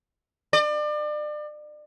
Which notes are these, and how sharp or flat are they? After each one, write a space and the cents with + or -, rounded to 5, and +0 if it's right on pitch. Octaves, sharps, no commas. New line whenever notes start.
D5 +35